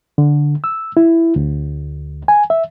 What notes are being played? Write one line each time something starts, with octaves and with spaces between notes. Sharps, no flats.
D3
E6
E4
D2
G#5
E5